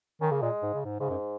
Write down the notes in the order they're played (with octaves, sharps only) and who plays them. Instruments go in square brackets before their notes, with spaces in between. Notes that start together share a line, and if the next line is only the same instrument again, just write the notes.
[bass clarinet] D#3 [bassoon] C#4
[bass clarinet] C#3 [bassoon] A#3
[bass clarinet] A#2 [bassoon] G#3
[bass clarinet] G#2
C#3
G#2
[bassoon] G#2 [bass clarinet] C#3
[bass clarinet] F#2